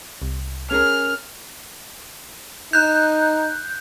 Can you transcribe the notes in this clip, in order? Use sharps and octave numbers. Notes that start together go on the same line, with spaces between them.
C2
C#4 G#4 A#4 F6
D#4 F#6 G6